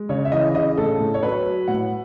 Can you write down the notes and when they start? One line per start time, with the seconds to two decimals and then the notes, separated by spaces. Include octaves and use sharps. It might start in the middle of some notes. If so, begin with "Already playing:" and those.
Already playing: G#3
0.09 C#3 C#5
0.25 E5
0.32 E3 D#5
0.54 C#3 D#5
0.77 A2 A4
0.99 A2
1.14 C#5
1.23 F#3 B4
1.45 F#3
1.68 A2 F#5